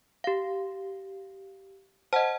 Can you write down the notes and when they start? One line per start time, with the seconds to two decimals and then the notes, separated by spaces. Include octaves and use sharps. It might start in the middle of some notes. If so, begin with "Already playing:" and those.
0.24 G4 F5
2.13 C5 D#5 F#5 A5